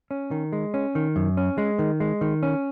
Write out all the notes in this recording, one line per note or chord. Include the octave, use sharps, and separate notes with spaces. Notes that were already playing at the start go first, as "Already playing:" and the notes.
C#4
D#3
G#3
C#4
D#3
F#2
C#4
G#3
D#3
G#3
D#3
C#4